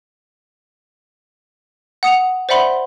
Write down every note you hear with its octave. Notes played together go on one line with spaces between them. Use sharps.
F#5 D#6 C#7 F7
C5 D5 E5 F#5 B5 C6